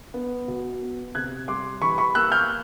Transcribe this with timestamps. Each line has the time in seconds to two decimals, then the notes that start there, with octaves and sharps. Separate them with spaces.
0.14 B3
0.48 B2
0.82 B3
1.15 C3 F#6 G#6
1.48 G3 C6 D6
1.81 E3 B5 C#6
1.98 B5 C#6
2.15 A#3 E6 F#6
2.32 F6 G6